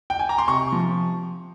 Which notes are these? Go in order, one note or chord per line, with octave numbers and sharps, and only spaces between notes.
G5
G#5
A#5
C6
C3 C#6
F3